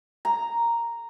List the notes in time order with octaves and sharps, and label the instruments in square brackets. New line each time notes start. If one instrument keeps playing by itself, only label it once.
[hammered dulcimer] A#5